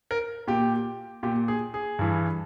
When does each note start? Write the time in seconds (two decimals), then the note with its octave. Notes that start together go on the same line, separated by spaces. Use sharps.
0.11 A#4
0.48 A#2 G4
1.23 A#2 G4
1.48 G#4
1.74 G#4
1.99 G2 E3